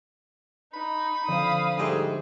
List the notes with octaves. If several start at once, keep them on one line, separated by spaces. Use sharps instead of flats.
D#4 B5
D3 F3 C4 F5 D#6
G#2 G3 A3 G#4